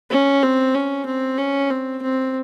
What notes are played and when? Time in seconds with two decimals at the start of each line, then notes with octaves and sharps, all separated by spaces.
0.11 C#4
0.43 C4
0.75 C#4
1.06 C4
1.38 C#4
1.71 C4
2.02 C4